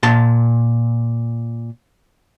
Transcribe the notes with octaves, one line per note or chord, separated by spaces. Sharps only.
A#2 A5 C6